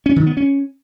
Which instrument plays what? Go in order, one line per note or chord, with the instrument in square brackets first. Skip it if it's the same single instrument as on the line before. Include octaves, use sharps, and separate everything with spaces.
[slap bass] C#4
D#3
B3
C#4